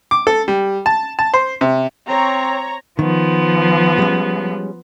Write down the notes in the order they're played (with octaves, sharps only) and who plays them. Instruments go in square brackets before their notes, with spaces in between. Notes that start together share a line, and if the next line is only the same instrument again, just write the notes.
[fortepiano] D6
A4
G3
A5
A5
C5
C3
[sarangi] C4 [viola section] C#5 A#5
[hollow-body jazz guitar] D#3 [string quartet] F3 B3
[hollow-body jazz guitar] G3 G#3 C#4